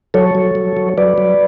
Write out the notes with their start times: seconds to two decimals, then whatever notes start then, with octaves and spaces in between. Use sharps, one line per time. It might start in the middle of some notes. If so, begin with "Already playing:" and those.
0.14 F#3 A4 C#5
0.35 F#3
0.55 F#3
0.77 F#3
0.97 F#3 B4 D5
1.18 F#3